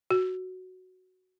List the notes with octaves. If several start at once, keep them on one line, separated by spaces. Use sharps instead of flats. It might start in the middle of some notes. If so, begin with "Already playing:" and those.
F#4